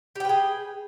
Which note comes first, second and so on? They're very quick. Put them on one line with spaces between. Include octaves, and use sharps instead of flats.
G4 G5 B4 G#4